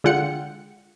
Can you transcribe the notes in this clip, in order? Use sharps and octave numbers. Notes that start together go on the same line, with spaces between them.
D3 G#3 F4 F#5 G5 C#7